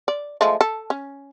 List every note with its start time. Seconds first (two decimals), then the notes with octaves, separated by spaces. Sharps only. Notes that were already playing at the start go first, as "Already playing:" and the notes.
0.08 D5
0.41 F3 G#3 A3
0.61 A4
0.90 C#4